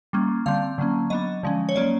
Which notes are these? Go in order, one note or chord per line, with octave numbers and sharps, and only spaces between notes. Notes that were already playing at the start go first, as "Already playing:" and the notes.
G3 A#3 C#4
D3 G3 C4 F5
D3 F#3 A#3 C#4
F#3 B3 D4 D#5
D3 F3 G#3 C#4
C#5
F#3 A#3 C#4 D5